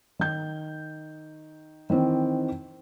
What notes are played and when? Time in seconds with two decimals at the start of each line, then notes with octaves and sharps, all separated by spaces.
0.19 D#3 G6
1.90 D#3 E3 C4